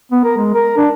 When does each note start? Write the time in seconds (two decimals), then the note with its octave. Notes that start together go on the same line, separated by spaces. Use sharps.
0.12 B3
0.24 A#4
0.37 G#3
0.55 A#4
0.77 D4